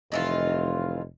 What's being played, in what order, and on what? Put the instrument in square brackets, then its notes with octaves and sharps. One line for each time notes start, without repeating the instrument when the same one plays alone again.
[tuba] F1 [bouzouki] D#3 E3 F4